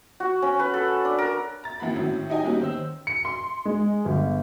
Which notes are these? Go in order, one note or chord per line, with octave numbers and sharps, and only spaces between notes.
F#4
C#4
B4
A4
D4
A#4
A#5 A6
G#1 E3 A#3 F#4 B5
A2 D#3 F#3 C#4
D#4 G4 D#5 G#5
F#3 G3 A#3 B3 C#4 D#4
D#3 C5 E6
C#7
C6
G#3
G1